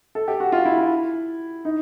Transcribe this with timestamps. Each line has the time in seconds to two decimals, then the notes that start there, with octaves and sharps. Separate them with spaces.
0.15 A4
0.28 G4
0.40 F#4
0.52 F4
0.65 E4
0.78 E4
1.65 D#4